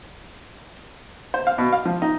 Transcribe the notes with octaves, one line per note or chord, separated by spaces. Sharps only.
C5
F5
B2
F5
F3
D#4